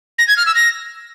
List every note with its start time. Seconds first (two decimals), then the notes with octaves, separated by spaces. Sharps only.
0.19 A#6
0.28 G#6
0.37 F6
0.46 E6
0.55 A#6